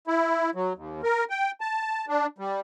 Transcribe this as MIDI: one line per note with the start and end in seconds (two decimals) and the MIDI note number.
0.07 0.50 64
0.55 0.73 54
0.75 1.01 39
1.03 1.24 70
1.30 1.51 79
1.61 2.05 81
2.08 2.26 62
2.38 2.60 55